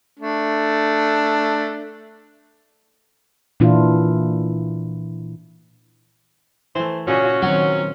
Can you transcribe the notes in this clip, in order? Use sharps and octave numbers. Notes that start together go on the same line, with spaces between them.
A3 D4
A#2 E3 D4 E4 F4
E3 A3 C5
A#2 C#3 C#4 F#4 G#4
D#3 F#3 C4 F#5